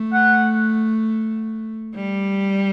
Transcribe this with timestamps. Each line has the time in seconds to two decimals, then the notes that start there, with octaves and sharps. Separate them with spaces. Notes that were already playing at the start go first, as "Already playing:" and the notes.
Already playing: A3
0.13 F#5
1.95 G3